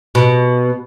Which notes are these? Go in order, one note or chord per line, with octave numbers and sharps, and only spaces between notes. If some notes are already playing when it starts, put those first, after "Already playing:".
B2